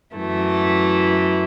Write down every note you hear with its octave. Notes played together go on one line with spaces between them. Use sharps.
F#2 E3 A3